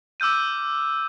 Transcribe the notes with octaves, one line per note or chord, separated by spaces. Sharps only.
D6 E6 F6 G6 D#7